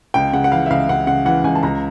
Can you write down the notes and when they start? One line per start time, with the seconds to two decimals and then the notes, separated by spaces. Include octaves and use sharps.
0.14 C#2 G5
0.33 C#3 F#5
0.44 F#5
0.52 E3 F5
0.66 E5
0.70 C#2 F5
0.89 C#2 F#5
1.07 C#3 F#5
1.25 E3 F#5
1.44 C#2 G#5
1.55 A5
1.63 C#2 A#5